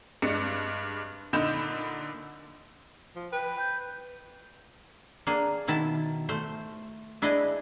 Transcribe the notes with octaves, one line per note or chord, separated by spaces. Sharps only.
G2 G#3 D4 C#7
A#2 D3 D#4 B5 G6 E7
F3
B4 G5
G6
A#3 D4 G#4
B2 D#3 E4 A5
A3 C5
D4 E4 G#4 B4 D#5